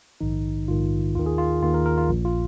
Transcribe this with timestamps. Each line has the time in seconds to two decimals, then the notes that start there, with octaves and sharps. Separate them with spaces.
0.21 A#1 G#2 D#3 D#4
0.68 A#1 G#2 D#3 F4
1.15 D#2 D#3 F4
1.26 G#4
1.38 F4
1.63 D#2 D#3 F4
1.74 A#4
1.86 A#4
1.98 F4
2.09 A#1 A#2
2.25 F4